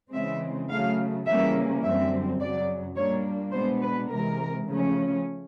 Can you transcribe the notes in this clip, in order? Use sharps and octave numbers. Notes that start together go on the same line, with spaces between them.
C#3 E3 G#3 C4 E5
C#3 F#3 A3 F5
C#3 E3 G3 A#3 C#4 E5
F#2 D3 G3 C4 E5
F#2 C#3 F#3 D5
A#2 G3 A#3 D4 C#5
B2 G#3 B3 D4 C5
B4
C3 E3 G#3 A#4
C#3 F3 A3 C#4